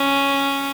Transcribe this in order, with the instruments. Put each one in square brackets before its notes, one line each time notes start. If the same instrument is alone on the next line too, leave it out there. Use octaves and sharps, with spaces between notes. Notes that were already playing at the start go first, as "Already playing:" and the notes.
Already playing: [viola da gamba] C#4